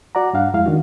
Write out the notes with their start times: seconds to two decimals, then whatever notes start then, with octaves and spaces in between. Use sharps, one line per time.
0.15 F#4 D5 F#5 A#5
0.33 G2 D4 F5 F#5
0.53 F2 G#3 E4 F5
0.66 D#3 D4 F#4